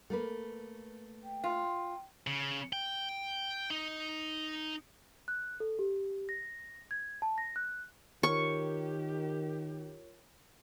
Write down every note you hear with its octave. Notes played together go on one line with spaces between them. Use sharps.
A3 A#3 B4
G5
F4
C#3
G5
D#4
F#6
A4
G4
A#6
G#6
A5
A#6
F#6
D#3 F4 G4 A#4 C#5 C#6